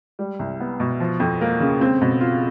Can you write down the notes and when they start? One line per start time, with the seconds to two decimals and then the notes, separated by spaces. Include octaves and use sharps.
0.19 G3
0.39 C2
0.60 B3
0.80 B2
1.00 F3
1.20 F2
1.41 A#3
1.60 C#3
1.81 C4
2.01 B2
2.21 F4